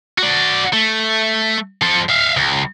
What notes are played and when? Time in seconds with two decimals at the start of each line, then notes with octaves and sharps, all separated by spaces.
0.18 F#4 D5
0.73 A3
1.82 F3 A4
2.10 E5 F5
2.37 C#2